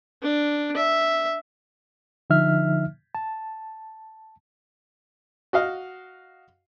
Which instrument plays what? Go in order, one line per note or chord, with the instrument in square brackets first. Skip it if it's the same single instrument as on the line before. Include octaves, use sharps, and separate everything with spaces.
[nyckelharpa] D4
E5
[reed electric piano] D3 F3 D#4 E5 F6
A5
[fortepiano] F#4 D#5 F5